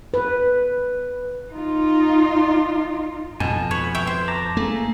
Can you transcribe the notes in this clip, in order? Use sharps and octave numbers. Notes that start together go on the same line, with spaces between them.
B4
D#4 F4
F2 B2 G#5 A5
B4 C#5
C#5 E5 G5
C5
A5 A#5 D6
A3 A#3 G#4